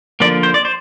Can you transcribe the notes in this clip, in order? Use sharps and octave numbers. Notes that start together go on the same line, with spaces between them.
D3 F3 A#3 D5
C5
D5
C5